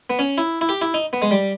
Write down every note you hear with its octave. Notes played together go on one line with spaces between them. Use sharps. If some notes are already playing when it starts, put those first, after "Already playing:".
B3
C#4
E4
E4
G4
E4
D#4
B3
G#3
G3